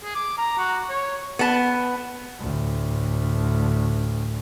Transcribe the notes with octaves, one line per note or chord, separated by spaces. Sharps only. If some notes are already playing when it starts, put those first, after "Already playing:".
G#4
D6
A#5
F#4
C#5
B3 A5
D2 A2